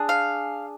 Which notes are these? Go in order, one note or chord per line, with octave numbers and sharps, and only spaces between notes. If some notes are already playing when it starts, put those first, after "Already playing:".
Already playing: D4 G#4
F5